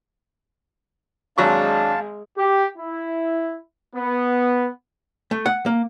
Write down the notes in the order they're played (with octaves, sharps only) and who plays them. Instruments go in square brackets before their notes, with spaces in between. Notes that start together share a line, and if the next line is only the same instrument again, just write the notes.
[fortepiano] G#1 F#3 C#6 [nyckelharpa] G#3 [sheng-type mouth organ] D4 [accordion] F5 A5
[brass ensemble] G4
E4
B3
[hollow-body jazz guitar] A3
F#5
A#3